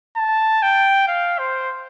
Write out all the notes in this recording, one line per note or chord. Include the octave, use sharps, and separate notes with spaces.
A5
G5
F5
C5